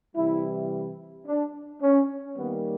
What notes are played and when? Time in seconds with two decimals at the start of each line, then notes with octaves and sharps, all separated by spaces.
0.16 C3 E3 G3 E4
1.27 D4
1.82 C#4
2.38 D#3 G3 A#3 B3